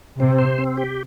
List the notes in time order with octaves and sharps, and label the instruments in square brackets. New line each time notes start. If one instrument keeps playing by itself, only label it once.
[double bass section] C3 [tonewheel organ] C4
[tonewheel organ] C5
C4
G4